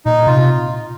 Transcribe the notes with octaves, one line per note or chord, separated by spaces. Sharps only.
A#2 D#4
C3 F4